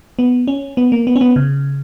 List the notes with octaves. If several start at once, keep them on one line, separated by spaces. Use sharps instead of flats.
B3
C#4
B3
A#3
B3
C#4
B3
C#3